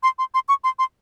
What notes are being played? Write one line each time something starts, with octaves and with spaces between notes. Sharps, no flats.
C6
C6
C6
C#6
C6
C6